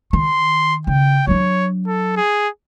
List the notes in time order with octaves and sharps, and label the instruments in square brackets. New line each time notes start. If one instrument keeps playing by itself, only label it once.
[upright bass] D#3 [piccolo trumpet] C6
[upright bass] C#3 [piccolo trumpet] G5
[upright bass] F#3 D4 [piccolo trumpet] C#5
[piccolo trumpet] A4
G#4